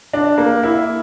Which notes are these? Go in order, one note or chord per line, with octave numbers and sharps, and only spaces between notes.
D4
A#3
E4